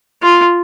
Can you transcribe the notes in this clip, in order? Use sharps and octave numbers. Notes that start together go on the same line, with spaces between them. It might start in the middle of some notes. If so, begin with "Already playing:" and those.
F4